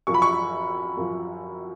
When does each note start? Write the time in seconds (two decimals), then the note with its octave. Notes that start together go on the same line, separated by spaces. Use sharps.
0.07 F#2 F3 C#6
0.14 B5
0.22 C#6
0.97 F#2 F3